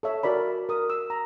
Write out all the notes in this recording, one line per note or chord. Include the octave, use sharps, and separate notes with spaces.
A4 C#5 E5
F#4 A#4 D5 B5
A#4 D#6
E6
A#5